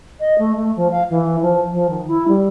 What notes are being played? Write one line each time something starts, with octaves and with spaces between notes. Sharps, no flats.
D#5
A3
A3
F3
F5
E3
F3
F3
D#3
E4
G3